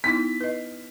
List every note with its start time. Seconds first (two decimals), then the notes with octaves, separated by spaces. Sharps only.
0.04 B3 D#4 E4 B6
0.41 B4 D#5